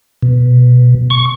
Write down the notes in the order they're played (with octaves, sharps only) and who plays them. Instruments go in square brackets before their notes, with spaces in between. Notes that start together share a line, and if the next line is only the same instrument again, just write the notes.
[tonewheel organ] B2
C#6